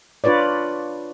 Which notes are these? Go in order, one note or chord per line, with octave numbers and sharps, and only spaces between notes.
D4 F4 B4 C#5 D5